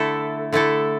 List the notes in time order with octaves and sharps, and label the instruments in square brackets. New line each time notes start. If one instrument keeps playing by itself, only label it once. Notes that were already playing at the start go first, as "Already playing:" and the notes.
Already playing: [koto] D3 A3 E4 A4
D3 A3 E4 A4